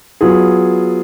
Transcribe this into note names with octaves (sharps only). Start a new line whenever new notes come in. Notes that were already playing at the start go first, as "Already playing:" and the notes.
F#3 B3 F4 G#4